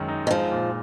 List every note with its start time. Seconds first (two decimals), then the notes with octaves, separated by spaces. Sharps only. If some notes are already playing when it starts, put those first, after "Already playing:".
Already playing: F#2 D#3 G#3
0.08 D#4
0.27 D#3
0.30 F3 G#3
0.52 A#2